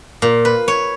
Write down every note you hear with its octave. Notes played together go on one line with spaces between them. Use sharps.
A#2
B4
C#5